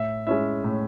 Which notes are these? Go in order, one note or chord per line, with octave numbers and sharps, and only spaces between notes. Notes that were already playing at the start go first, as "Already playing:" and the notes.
Already playing: A2 E5
G#3 C#4 E4 E5
A2